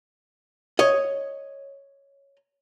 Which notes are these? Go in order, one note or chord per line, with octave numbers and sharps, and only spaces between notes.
C#5 D#5